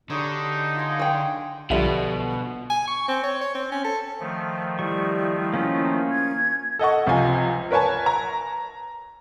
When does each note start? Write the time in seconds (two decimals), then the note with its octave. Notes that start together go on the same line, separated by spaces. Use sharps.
0.10 D3 G3 G#3 D#4 C#5
0.76 F4 G#5
1.00 G#4 G5
1.70 B1 B2 D3 F3 G3 E5 D#7
2.70 G#5
2.87 C#6
3.08 C4
3.24 C#5
3.41 C#5
3.55 C4
3.72 C#4
3.85 A4
4.20 D#3 F3 A3
4.79 G3 E4 C#6
5.54 A#3 C#4 F4
6.11 G#6
6.79 A4 D#5 F#5 C#6
7.06 C#2 C3 F3 F4 G#5
7.71 A#4 B4 C#5 G#5 A5
8.06 A#5